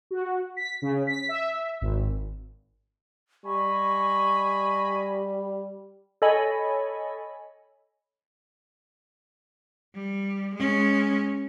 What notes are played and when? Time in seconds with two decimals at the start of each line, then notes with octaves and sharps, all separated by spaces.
0.11 F#4
0.57 B6
0.82 C#3
1.07 B6
1.29 E5
1.81 G#1
3.45 G3 D#5 G#5 B5 C#6
6.22 A4 C#5 D#5 G#5 B5
9.95 G3
10.55 G#3 C#4